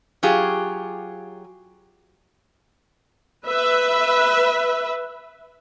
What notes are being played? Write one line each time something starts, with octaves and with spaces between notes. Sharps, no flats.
F#3 F4 G4 G#4
B4 E5